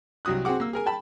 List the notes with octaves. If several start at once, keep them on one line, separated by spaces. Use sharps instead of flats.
C2 F#3 F#4 D#6 F#6
C4 F#4 G#4 F#5 D6
A#3 E6
G#4 A#4 G#5
G5 A5 B5